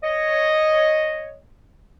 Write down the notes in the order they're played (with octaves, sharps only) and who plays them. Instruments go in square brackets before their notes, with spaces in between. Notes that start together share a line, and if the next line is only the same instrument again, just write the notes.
[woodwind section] C#5 D#5